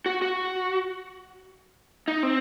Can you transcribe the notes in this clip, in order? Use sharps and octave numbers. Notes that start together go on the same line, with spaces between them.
F#4
F#4
D#4
C4